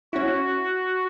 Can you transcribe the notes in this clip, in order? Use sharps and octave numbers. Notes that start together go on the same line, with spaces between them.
C#4 E4 F#4